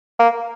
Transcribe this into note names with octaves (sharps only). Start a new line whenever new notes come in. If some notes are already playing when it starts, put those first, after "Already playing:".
A#3